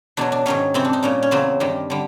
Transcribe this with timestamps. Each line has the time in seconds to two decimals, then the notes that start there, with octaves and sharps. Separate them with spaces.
0.17 E2 B2 F#3 D4
0.32 D4
0.46 G#2 D#3 F#3 C#4
0.74 F2 C3 E3 C4
0.85 D4
0.93 D#4
1.03 A#2 G3 C#4
1.23 C#4
1.31 E2 C#3 F#3 C4
1.60 G2 D#3 G3
1.90 D3 G3